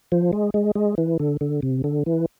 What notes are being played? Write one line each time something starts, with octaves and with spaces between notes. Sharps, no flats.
F3
G#3
G#3
G#3
E3
D3
D3
C3
D3
E3